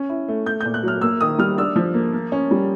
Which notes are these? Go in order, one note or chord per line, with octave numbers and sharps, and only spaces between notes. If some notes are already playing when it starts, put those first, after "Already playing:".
Already playing: C#4
E4
A3
A3 G6
G6
A#2
F#6
F#3 F6
A#3 E6
D#3 D#6
G3 F6
D4 E6
F3
A#3
A#3
C#4
G3